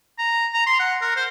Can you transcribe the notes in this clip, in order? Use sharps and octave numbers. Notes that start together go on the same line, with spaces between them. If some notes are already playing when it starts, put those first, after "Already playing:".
A#5
A#5
C6
F#5
A#4
C5